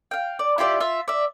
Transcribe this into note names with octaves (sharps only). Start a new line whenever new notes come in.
F5 G5
D5
E4 F4 G4 D5
F4 E5
D5 E5